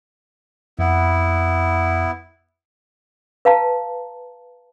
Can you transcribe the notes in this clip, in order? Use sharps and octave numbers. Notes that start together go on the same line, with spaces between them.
F2 B3 E4 F#5
B4 F5 A5 A#5